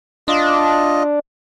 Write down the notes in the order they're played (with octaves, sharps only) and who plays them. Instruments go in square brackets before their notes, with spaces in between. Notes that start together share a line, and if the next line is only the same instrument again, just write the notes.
[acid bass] D4 [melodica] F4 D#5